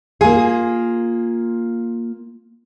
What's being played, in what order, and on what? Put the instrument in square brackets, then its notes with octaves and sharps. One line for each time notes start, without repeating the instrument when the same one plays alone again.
[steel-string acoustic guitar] A#3 F4 [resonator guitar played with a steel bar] G#4